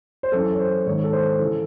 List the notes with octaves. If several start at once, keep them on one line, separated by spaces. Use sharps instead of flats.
C5
F#2 E3 A4
C#5
C5
G#2 D#3 C#5
A4
C5
C#3 E3 A4